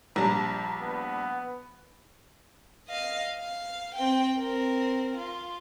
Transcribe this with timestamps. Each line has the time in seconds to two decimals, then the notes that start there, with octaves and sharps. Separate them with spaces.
0.16 A#1 G3 A5 A#5
0.81 B3
2.88 D#5 F5
3.40 F5
3.95 C4 G5
4.38 C4 A#4
5.17 F4